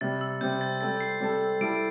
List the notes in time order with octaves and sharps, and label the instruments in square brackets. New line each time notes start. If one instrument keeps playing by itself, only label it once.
[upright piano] C3 G3 C4 [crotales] A6
[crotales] E6
[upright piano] C3 G3 C4 [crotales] G6
[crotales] A6
[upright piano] G3 C4 A4 [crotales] A6
[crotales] C7
[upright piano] G3 C4 A4
[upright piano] G3 E4 A4 [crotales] D7